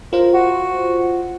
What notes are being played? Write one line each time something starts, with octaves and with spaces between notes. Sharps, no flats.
F4 A#4 C5
F#4